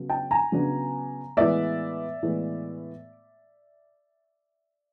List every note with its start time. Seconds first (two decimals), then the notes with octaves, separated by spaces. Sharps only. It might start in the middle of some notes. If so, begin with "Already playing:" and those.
Already playing: C#3 F#3 B3
0.10 G5 A5
0.31 G#5 A#5
0.52 C#3 F#3 B3 D4
1.37 A2 E3 G#3 B3 D5 E5
2.22 A2 E3 G#3 B3